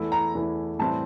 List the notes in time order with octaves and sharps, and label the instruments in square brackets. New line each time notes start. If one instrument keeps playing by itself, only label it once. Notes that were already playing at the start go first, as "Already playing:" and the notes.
Already playing: [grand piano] E2 E3 A3 E4
[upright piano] A#5
[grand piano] E2 E3 A3 E4
[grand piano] A2 E3 G3 C4 [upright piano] A5